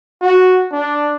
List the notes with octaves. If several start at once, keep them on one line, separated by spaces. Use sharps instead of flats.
F#4
D4